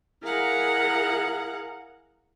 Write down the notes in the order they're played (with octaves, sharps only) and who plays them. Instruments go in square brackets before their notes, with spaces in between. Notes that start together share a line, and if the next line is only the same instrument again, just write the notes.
[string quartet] E4 G#4 A#4 F5 F#5 A#5